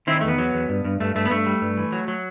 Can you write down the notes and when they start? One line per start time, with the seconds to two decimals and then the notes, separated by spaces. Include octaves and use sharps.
0.07 D#3 C4 E4
0.21 E2 A3
0.28 B3
0.38 F#3
0.54 E2
0.69 G2
0.84 G2
1.00 G2 A3
1.15 G2 A3
1.26 B3
1.31 G2 A3
1.46 G3
1.61 G2
1.78 E3
1.92 F#3
2.08 F#3